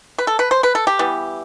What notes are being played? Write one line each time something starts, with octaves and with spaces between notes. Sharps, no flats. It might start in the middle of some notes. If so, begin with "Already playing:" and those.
B4
A4
B4
C5
B4
A4
G4
E3 G3 B3